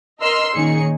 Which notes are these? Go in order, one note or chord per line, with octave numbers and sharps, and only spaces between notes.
A#4 D#5 C6 E6 F6
A#2 D#3 C#4 D#4 G#4 C#7